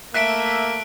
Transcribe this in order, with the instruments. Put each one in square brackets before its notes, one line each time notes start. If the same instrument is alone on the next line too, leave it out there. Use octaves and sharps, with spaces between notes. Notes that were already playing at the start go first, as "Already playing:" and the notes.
[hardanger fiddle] A3 [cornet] A#3 [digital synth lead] E5 [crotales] F#6 B6 D7